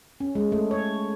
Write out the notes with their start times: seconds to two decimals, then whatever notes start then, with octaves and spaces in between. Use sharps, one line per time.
0.20 C#4
0.35 G#3
0.52 A3
0.71 C#5